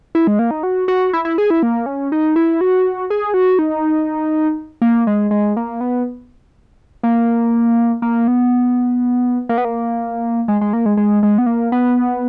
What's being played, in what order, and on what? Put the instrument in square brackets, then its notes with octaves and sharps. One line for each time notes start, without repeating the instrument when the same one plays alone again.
[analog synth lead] E4
G#3
A#3
D#4
F#4
F#4
E4
E4
G#4
E4
A#3
C#4
D#4
E4
F#4
G#4
F#4
D#4
A#3
G#3
G#3
A#3
B3
A#3
A#3
B3
A#3
B3
A#3
G#3
G#3
A#3
G#3
G#3
G#3
B3
A#3
B3